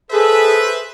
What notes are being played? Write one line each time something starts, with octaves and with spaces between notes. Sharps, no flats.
G#4 A4 B4 C5 E5